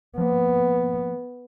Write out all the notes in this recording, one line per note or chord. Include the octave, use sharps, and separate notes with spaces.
F3 A#3 B3